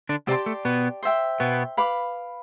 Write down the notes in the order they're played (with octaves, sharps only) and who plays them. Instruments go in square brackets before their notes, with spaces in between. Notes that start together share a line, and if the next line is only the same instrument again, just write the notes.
[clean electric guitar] D3 D4
[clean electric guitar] C3 C4 [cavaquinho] G4 D5 A5 C6
[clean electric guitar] A3
B2 B3
[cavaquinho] C5 E5 G5
[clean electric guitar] B2 B3
[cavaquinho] B4 F5 B5 D6